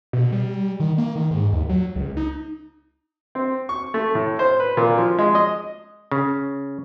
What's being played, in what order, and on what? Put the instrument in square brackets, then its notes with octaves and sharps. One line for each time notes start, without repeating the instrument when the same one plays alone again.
[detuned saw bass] B2
G3
D#3
A#3
D#3
G#2
D#2
F#3
C#2
D#4
[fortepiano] C4
C#6
A3
A2
C5
B4
A#2
F3
G#3
D#5
[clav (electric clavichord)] C#3